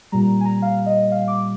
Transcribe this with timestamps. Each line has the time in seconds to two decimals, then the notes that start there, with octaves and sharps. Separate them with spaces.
0.12 A#2 G3 A#5
0.41 G#5
0.45 A#5
0.62 F5
0.86 D#5
1.12 F5
1.28 D6